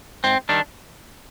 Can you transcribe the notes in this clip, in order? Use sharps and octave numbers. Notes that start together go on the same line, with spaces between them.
G#2 C4
D#3 G3 D4